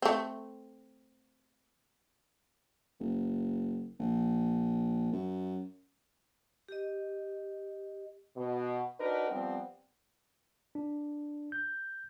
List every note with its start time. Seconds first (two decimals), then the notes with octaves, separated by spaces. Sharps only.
0.02 A3 C4
3.00 F#1
3.99 A#1
5.12 F#2
6.68 G4 D#5
8.36 B2
9.00 D4 D#4 F#4 A#4 B4
9.29 F3 G3 B3 C4
10.75 D4
11.52 G6